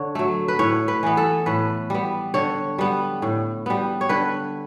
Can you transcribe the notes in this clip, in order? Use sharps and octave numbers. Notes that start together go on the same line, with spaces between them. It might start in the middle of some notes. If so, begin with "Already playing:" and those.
Already playing: D3 C#5
F#3 A3
B4
A2 C#5
B4
E3 B3
A4
A2 B4
G3 B3
D3 C#5
G3 B3
A2
G3 B3
C#5
D3 B4